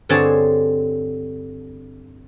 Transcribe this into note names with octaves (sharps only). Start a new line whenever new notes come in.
G2 D3 C4 G#4 C#5 A5